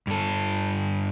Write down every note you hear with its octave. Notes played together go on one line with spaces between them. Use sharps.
G2 A4